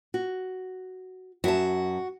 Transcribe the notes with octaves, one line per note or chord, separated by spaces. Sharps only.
F#4
F#2 F#4 E5 A5